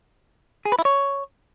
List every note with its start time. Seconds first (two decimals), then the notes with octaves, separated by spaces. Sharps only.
0.65 G#4
0.72 B4
0.79 E4
0.85 C#5